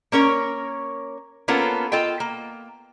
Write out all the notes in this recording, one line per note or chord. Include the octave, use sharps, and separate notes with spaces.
A#3 C#4 A#4 C#5
A#3 B3 C#4 F4 A4 A#4
F4 A4 D#5 G5
A#3